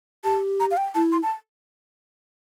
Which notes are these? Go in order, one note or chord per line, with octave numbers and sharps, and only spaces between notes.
G4 A5
A#5
F5
G5
E4 A5
C6
A5